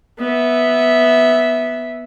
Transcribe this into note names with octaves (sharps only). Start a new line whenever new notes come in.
B3 E5